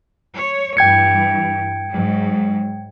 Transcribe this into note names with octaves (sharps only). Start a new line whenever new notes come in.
C#5
G2 E3 G5 G#6 C#7
G#2 F#3